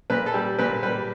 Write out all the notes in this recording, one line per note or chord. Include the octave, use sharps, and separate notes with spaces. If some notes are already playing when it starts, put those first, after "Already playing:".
A#2 B4
A4
G3
A#2 B4
G3 B4